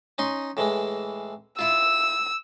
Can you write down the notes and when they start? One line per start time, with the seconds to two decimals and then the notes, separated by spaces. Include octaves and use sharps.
0.18 C#4 D#4 C6
0.57 A2 E3 G#3
1.59 E4 F4 E6